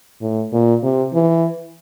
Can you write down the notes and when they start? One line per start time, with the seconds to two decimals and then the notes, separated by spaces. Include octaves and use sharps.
0.21 A2
0.53 A#2
0.83 C3
1.14 E3